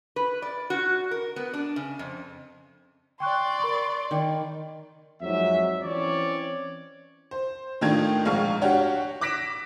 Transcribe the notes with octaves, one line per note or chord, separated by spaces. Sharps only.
B4
D5
F#4
A#4
B3
D4
C#3
F2
D5 G5 C6 C#6 F#6
A#4 B5 C#6
D#3 D5 G5
F2 G#2 F#3 E5
E3 C4 C#4 C#5 D5
C5
A2 D#3 D4 F4 G#6
A#1 G#2 F5 C#6 F6
D4 F#4 G4 C#5
D6 F#6 A#6 B6 D7 E7